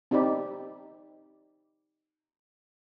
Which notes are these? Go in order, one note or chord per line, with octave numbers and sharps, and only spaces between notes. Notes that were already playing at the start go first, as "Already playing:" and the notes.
C4 D#4 G4 D5 B5